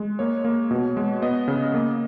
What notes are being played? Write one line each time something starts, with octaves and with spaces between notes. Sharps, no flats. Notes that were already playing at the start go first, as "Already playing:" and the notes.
Already playing: G#3
A#3 C#5
A#3
B2
G#3
B3 D#5
C#3
A#3